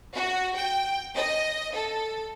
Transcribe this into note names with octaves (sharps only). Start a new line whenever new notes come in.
F#4
G5
D#5
A4